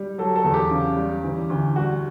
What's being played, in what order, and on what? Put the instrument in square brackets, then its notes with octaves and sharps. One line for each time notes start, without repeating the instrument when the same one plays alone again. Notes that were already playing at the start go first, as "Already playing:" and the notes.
Already playing: [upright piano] G3
F#3 A4
A4
E2
G4
C#3
G3
E3
D2
G3 F#4